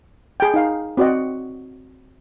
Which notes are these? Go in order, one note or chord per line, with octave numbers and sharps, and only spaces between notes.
G#4 G5
D#4 F5
C4 F#4 D5 D#5